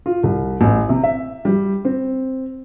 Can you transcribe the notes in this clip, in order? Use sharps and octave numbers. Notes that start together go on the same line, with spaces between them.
F4
C2
A1
C3
E5
G3
C4